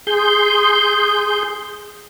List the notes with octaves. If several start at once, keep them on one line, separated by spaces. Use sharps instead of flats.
G#4 C6 G6